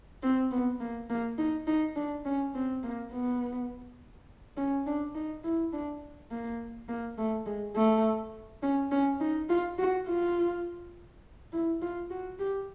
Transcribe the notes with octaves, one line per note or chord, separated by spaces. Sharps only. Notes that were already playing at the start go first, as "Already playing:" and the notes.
C4
B3
A#3
A#3
D#4
D#4
D4
C#4
C4
A#3
B3
C#4
D4
D#4
E4
D4
A#3
A#3
A3
G#3
A3
C#4
C#4
D#4
F4
F#4
F4
E4
F4
F#4
G4